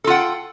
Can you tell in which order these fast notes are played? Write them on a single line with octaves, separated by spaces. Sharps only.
A4 F4 F#5 G5